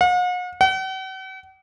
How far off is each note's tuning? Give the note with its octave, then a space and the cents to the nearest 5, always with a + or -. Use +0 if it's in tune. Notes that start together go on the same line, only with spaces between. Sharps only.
F#5 -45
F#5 +45